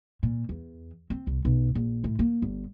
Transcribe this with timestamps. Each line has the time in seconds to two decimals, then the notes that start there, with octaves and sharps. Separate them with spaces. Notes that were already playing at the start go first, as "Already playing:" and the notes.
0.23 A#2
0.49 E2
1.10 C4
1.27 C2
1.45 B1
1.75 A#1
2.04 A2
2.19 A#3
2.42 G1